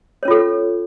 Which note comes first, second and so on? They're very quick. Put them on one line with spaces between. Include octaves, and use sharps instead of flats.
C#5 C#4 F4 A4